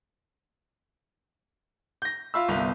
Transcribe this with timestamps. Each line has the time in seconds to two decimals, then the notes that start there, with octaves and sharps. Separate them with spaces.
2.02 G6 A#6
2.34 F4 E5 F5 B5 E6
2.48 G1 C2 B3 F5 F7